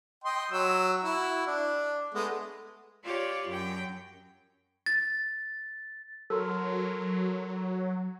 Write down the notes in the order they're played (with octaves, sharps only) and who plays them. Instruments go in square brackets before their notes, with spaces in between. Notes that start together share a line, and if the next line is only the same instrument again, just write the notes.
[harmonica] D#5 G5 C6
F#3 E6
E4 F#4
D4
G#3 A3 B3
[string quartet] F4 G4 C#5 D5
F#2 G5
[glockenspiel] A6
[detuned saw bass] F#3 [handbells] A4 A#4 C6